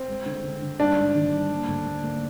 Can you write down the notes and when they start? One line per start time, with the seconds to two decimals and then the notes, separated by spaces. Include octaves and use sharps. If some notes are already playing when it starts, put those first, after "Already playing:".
Already playing: C4
0.08 G#3
0.26 D3
0.43 D3
0.62 D3
0.80 G3 D4
0.97 G#2
1.15 G#1
1.33 G3
1.50 A#3
1.69 D2
1.86 A#3
2.04 A#3